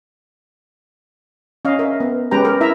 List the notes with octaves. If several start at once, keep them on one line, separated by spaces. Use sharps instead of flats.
C#4 D#5 F5
A#4 E5
B3
G#3 C#4 G4 B4 G5 A#5
A#4
E4 E5 A#5